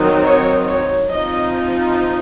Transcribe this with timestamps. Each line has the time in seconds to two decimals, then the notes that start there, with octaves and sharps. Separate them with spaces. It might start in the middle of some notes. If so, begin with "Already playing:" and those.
Already playing: D#3 F#3 C4 D#4
0.25 C#5
0.68 C#5
1.11 F3 C4 D#4 D#5